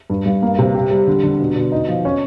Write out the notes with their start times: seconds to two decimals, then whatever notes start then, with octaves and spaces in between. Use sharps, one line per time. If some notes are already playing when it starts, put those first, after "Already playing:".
0.10 G2
0.26 G2
0.42 A#3
0.59 C3
0.75 G4
0.91 G3
1.08 D3
1.23 D3
1.40 B2
1.56 B2
1.72 D#4
1.89 F3
2.05 C#4